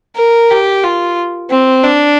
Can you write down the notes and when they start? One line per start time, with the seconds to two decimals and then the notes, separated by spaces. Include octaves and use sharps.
0.17 A#4
0.50 G4
0.84 F4
1.50 C4
1.84 D4